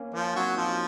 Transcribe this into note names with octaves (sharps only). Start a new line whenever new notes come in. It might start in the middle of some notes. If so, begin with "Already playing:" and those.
Already playing: A#3 C#4
F3 A#3 C#4
F#3 C4 D#4
F3 D#4 F#4